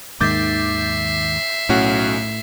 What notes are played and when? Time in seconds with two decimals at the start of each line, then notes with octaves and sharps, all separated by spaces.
0.21 D#2 G#2 D#3 E5 D6 G6 A6 C7
1.69 B1 A2 C#4 F#4